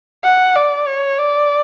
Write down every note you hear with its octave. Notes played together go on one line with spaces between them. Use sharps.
F#5
D5
C#5
D5